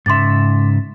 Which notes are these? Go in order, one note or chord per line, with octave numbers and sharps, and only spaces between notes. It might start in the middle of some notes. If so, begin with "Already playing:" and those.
G#2 C#3 E5 C6 D6 A6